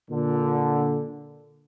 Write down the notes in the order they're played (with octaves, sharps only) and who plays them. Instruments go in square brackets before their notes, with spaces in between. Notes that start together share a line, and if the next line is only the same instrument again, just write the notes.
[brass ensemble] A#2 D3